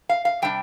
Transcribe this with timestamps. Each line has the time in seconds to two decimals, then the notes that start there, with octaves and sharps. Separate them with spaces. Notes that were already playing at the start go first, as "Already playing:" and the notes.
0.09 F5
0.25 F5
0.42 C3 G3 D4 G5